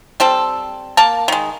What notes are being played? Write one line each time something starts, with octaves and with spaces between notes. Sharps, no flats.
G3 C4 A4
A#3 A#4 A5
D#3 G#3